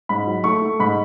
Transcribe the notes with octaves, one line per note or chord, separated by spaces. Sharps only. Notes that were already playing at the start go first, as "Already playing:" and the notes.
G#2 B5
F#3
A3 C#6
A3
G#2 B5